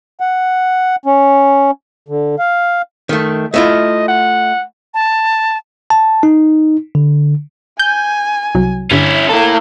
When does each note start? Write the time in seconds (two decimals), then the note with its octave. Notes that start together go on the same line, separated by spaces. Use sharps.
0.20 F#5
1.06 C#4
2.08 D3
2.39 F5
3.09 D#3 A3
3.54 A3 E4 F4 D#5
4.08 F#5
4.94 A5
5.90 A5
6.23 D#4
6.95 D3
7.79 G#5 G6
8.55 C2 F#3
8.91 G2 D3 C#4 E4 E5
9.29 A#3 E4 A4